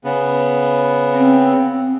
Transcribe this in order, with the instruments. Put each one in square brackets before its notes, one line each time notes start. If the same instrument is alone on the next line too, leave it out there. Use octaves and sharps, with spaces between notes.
[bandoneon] C#3 B3
[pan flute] C4